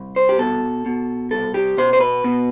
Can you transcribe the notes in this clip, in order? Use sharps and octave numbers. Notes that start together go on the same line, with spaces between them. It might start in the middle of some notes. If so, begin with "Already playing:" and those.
Already playing: C2
C5
G4
B2 A4
B2
C2 A4
G4
B2 C5
C5
B4
B2